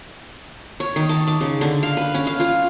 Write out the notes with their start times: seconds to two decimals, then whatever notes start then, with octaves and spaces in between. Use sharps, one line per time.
0.80 C#5
0.96 D#3
1.09 A5
1.27 D6
1.41 C#3
1.61 D3
1.83 F5
1.97 B4
2.14 C#4
2.27 F5
2.40 F4